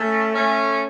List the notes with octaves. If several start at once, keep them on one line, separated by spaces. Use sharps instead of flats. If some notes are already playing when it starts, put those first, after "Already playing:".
Already playing: A3 C#4
A3 C#4